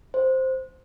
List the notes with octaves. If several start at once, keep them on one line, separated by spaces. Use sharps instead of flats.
C5